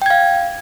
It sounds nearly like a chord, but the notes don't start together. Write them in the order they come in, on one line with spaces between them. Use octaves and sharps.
G5 G#6 F5